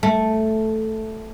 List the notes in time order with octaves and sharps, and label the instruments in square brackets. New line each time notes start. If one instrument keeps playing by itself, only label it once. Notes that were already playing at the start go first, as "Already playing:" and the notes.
[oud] A3